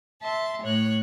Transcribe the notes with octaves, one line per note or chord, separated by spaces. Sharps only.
E5 A5 C6
A2 C#5 F#6